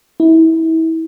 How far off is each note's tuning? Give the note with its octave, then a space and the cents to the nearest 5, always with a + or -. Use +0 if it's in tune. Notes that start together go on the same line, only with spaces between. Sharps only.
E4 -30